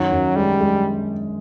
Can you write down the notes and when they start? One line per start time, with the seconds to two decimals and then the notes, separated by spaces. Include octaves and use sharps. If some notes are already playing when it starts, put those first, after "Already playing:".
Already playing: F#2 D#3 F#3
0.12 F#2
0.36 G3 G#3
0.61 G#3